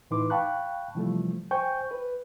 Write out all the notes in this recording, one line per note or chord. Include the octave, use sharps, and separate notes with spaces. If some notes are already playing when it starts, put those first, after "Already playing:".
A2 E3 D#4 B4 C6 D6
F5 G5 A5 B5 C#6 F#6
C3 E3 F3 G3 A3
C5 G5 G#5 C#6 G6
B4